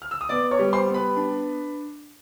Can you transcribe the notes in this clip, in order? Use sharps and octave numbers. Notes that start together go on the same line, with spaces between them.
F6
E6
D#6
B3 D5 D6
C#5 C#6
G3
C5 C6
B3
B4 B5
D4